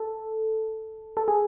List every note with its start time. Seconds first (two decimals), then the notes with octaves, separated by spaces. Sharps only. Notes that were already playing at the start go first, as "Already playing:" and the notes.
Already playing: A4
1.17 A4
1.28 G#4